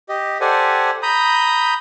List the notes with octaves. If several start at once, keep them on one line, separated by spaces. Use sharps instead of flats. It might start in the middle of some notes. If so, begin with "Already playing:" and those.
G4 D#5
G4 A4 C5 D5 F#5 G#5
A#5 B5 D#6 G6